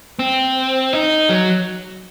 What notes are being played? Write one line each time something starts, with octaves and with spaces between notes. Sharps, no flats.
C4
D#4
F#3